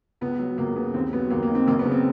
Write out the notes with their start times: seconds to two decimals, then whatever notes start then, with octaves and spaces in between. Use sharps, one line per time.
0.21 C#2 B3
0.39 F#3
0.58 C#2 A#3
0.76 C#3 B3
0.94 D#2 C4
1.13 F#3 B3
1.30 D#2 A#3
1.43 A#3
1.49 D#3
1.55 C4
1.67 F#1 A#3
1.79 B3
1.86 C#3
1.91 C4